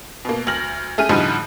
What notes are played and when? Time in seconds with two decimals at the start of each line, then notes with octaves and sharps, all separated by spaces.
0.25 B2 A#3
0.47 D2 F6 A#6 F#7
0.98 A3 C#4 G#4 F6 D#7
1.09 A2 D3 F3 G3 D#4 F#4